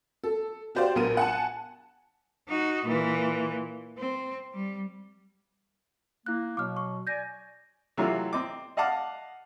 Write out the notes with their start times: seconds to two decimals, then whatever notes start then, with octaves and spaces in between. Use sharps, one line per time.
0.24 A4
0.75 F#4 G4 C5 D5 F5
0.95 A#1 B3 A#4 D#7
1.17 F#5 G#5 A5
2.48 D#4 F#4
2.84 A#2 E3
3.98 C4
4.54 G3
6.26 A#3 E4 F#6
6.57 B2 F#3 D6 F6
6.77 C#6
7.07 D5 G#5 G6 A#6
7.97 C3 E3 F#3 A3 F4
8.33 C4 D#5 D6
8.77 D#5 F5 F#5 A5 D6 F6